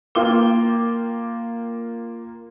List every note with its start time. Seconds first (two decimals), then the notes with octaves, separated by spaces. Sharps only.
0.15 A#3 F4 G5 D6 G7